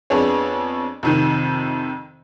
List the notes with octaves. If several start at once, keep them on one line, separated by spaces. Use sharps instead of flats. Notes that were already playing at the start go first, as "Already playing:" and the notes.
F2 B3 D4 G#4 C#5
F2 C3 D#3